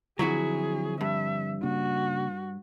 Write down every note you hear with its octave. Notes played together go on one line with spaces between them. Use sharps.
D3 F3 F#3 C4 E4 F#4 G#4
G2 E5
C#3 A#3 D4 F#4